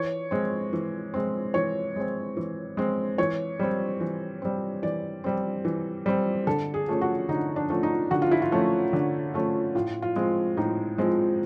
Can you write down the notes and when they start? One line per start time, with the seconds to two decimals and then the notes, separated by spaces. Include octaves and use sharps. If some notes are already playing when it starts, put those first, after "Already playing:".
Already playing: E3 C#5
0.31 G#3 C4
0.73 E3
1.14 G#3 C4
1.54 E3 C#5
1.96 G#3 C4
2.37 E3
2.77 G#3 C4
3.18 E3 C#5
3.59 G3 C4
4.00 E3
4.42 G3 C4
4.83 E3 D5
5.24 G3 C4
5.65 E3
6.06 G3 C4
6.47 D3 A4
6.74 G#4
6.88 F3 A3 C#4
7.01 F#4
7.29 D3 D#4
7.56 D4
7.70 F3 A3 C#4
7.83 D#4
8.11 D3 F#4
8.22 F4
8.31 E4
8.42 F4
8.52 F3 A3 C#4
8.93 D3
9.34 F3 A3 C#4
9.75 A2 F4
10.02 F4
10.16 F3 G#3 C4
10.57 A2 D#4
10.98 F3 G#3 C4